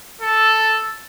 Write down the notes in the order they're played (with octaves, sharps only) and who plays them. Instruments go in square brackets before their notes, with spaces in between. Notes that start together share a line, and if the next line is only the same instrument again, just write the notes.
[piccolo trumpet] A4